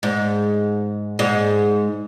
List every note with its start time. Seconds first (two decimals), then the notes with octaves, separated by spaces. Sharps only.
0.03 G#2
1.19 G#2